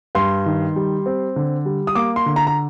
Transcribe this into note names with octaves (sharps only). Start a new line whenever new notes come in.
G2 C6
D#3
G3
C4
D3
G3
D#6
A#3 D6
C6
D3
A#5
A#5